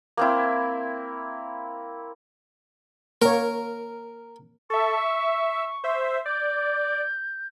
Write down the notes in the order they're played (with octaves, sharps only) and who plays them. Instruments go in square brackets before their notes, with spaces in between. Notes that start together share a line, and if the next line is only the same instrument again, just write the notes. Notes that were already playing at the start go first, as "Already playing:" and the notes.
[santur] A#3 C4 E4
[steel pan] A#3 C#5 [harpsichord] A#4
[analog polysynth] A4 E5 [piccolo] C#6
[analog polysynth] E5
C5 E5
[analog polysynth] D5 [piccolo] G6